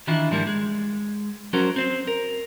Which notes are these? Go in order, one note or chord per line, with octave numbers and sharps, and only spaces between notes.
D#3 E3 D4 E4 F4
G#2 F3 G3 A#3 E4
G#3
F3 F#3 C#4 F#4 A#4 C5
C4 C5
A#4